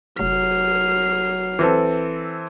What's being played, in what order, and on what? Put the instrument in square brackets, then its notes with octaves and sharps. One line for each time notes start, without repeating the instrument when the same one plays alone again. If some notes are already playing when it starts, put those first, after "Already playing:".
[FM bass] F1 [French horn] F#3 [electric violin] F6 C7
[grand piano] E3 C4 A4